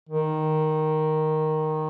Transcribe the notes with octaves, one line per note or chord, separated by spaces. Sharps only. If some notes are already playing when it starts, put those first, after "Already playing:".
D#3